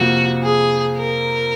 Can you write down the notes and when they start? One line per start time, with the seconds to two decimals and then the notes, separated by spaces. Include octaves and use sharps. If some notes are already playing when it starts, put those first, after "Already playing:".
Already playing: F2 C3 F3 A#3 F4 F#4
0.43 G#4
0.97 A#4